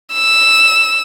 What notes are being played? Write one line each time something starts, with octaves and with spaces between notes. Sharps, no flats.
E6